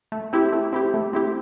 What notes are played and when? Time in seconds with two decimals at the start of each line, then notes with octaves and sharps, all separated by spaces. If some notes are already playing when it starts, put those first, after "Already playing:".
0.12 A3
0.33 C4 E4 G4
0.53 A3
0.73 C4 E4 G4
0.94 A3
1.13 C4 E4 G4